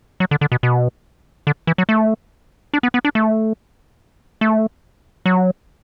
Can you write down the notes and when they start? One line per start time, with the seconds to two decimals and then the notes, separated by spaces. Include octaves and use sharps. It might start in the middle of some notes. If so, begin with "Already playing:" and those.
0.20 F#3
0.31 D3
0.41 D3
0.52 B2
0.63 B2
1.47 D3
1.67 E3
1.78 F#3
1.89 A3
2.74 D4
2.83 B3
2.94 B3
3.05 D4
3.15 A3
4.41 A3
5.26 F#3